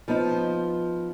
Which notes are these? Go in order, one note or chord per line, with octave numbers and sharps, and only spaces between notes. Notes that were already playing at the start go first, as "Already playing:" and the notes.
F3 B3 D#4